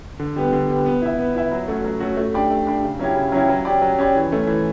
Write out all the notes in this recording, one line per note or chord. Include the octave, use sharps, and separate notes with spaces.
D3
G3 B3
D3
G3 B3
B3
E4 B4 E5
B3
E4 B4 E5
F#3
A3 C#4 F#4
F#3
A3 C#4 F#4
A3
D4 G4 D5
A3
D4 G4 D5
C#3
F#3 C#4 E4 G4
C#3
F#3 C#4 E4 G4
F#3
C#4 G4 D5
F#3
C#4 G4 D5
E3
A3 C#4
E3